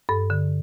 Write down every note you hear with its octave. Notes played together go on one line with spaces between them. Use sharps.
G2 A4
D3